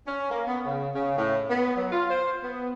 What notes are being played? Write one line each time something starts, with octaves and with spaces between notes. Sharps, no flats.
C#4
A#3
B3
C#3
C#3
A2
B3
F#3
F4
C5
B3